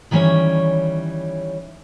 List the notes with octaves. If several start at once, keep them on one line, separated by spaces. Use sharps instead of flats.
D#3 E3 G3 C4 C#4 C#5